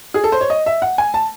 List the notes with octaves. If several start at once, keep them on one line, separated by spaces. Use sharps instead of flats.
G#4
A4
C5
C#5
D#5
E5
F#5
G#5
A5